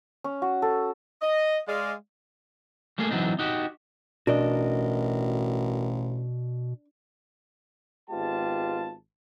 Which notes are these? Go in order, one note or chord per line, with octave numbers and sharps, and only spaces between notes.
C#4
F#4
A4
D#5
G#3 D5 F5
G3 A3 A#3 G#4
E3 F#3 C4 D4 D#4
D#4 F#4 G4
A1 B2 D4 F#4 A#4 D#5
G#1 G#3 B3 F4 G4 A5